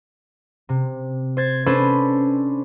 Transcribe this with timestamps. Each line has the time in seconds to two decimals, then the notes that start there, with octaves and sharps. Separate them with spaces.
0.69 C3
1.37 C5 G#6 A6
1.66 C#4 D4 A4 B4 C5 B5